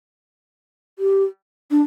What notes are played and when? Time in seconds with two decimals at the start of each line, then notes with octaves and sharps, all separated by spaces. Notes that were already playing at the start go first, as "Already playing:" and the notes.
0.99 G4
1.71 D4